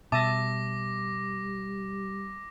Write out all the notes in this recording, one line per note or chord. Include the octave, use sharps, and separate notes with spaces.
B2 G3 E5 A5 D6 D#6 A#6